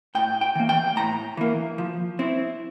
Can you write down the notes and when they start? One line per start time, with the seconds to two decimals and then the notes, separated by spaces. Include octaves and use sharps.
0.15 A2 G5
0.41 G5
0.55 E3 A#3
0.69 G5
0.96 A2 A#5
1.37 E3 A#3
1.78 F3
2.19 C4 E4